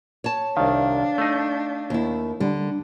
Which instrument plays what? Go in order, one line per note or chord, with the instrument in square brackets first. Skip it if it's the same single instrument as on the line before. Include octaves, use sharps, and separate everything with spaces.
[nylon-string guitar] C#5 A5
[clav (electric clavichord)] C2 D#3 [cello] D4 [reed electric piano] F5
[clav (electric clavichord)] A3 D#4
[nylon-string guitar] D#2 E4
[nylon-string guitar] D3 [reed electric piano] G3 D4